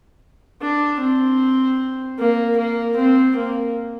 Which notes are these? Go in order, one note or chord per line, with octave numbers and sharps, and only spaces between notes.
D4
C4
A#3
A#3
C4
A#3